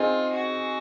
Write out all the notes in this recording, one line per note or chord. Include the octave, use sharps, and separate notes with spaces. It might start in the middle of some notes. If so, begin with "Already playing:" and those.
Already playing: C4 D#4 F4 G#4
F#4